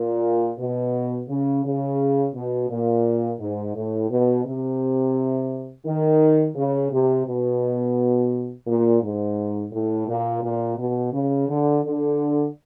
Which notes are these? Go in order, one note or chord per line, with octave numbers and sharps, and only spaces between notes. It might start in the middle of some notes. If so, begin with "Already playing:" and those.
Already playing: A#2
B2
C#3
C#3
B2
A#2
G#2
A2
B2
C3
D#3
C#3
C3
B2
A#2
G#2
A2
A#2
A#2
B2
C#3
D3
D3